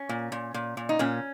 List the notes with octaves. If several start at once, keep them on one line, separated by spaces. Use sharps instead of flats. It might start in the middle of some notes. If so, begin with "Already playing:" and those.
Already playing: C#4
A#2
A#2
A#2
A#2
D#4
A#2 C#4